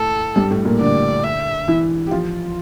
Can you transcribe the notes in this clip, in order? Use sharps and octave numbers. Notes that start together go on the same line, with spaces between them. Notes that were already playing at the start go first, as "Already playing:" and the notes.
Already playing: A2 A3 A4
G2 G3
A2 A3
A#2 A#3
D3 D4 D5
E5
E3 E4
G4
F3 F4